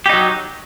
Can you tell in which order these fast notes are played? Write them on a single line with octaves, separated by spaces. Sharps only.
G4 D#4 F#3